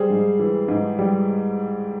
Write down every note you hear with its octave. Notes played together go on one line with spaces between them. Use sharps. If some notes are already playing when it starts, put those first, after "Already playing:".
Already playing: G3 G#4 C5
G#2
E3
G#2
G3